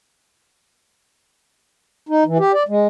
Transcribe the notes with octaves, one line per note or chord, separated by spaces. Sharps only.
D#4
E3
G4
D5
G#3